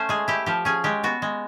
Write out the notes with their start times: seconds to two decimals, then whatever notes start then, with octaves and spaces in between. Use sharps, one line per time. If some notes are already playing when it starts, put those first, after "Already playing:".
Already playing: A3 C#4 C5
0.09 G#3 G#4
0.28 E4 G4
0.46 F3 G4
0.65 C#4 G#4
0.84 G#3 G4
1.03 B3 F#4
1.22 G#3